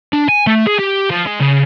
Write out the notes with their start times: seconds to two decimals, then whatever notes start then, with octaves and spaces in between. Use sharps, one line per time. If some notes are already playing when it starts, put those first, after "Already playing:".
0.13 D4
0.28 G#5
0.47 A3
0.67 G#4
0.79 G4
1.10 F3
1.27 G#3
1.40 C#3